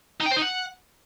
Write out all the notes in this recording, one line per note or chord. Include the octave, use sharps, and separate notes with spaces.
D#4
G5
C5
D#4
F#5